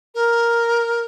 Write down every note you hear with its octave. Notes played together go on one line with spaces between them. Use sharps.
A#4